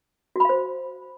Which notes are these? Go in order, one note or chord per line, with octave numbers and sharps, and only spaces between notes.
F#4 C5 F5 B5